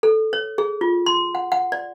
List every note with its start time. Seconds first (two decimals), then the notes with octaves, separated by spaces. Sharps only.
0.03 A4
0.33 C#5
0.58 G#4
0.81 F4
1.06 C6
1.35 F#5
1.52 F#5
1.72 D5